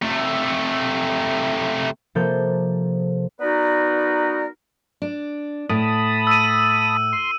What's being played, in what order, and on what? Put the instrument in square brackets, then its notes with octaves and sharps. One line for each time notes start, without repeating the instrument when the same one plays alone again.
[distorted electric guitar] C3 A3
[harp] C3 F3 A#3 A4 G6
[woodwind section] B3 D#4 F#4 A#4 B4 D5
[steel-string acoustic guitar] D4
[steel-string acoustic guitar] A2 [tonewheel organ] A5 B5 D#6
[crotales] E6 D#7
[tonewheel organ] C6